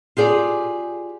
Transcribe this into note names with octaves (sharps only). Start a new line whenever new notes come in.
F4 G4 G#4 D5